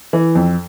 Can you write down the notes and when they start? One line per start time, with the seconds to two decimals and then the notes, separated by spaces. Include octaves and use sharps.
0.13 E3
0.35 F2